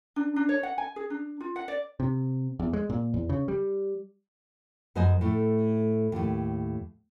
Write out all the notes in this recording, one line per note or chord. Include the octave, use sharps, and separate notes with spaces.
D4
D4
C#5
F#5
G#5
G#4
D4
F4
F#5
D5
C3
E2
G#3
A#2
E2
C#3
G3
F#2 B4 C5 D#5 G#5
A2 A3
D#2 A2